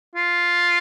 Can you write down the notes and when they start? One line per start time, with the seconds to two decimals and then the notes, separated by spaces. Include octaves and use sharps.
0.16 F4